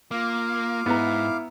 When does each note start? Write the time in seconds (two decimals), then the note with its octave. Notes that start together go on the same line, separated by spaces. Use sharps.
0.11 A#3 F4 F5 D6
0.86 G#2 B3 E4 A#5